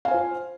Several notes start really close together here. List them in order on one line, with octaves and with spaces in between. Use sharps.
F5 G#5 C5 F4